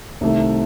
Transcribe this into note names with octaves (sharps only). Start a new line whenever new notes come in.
C2 C3 D#3 A3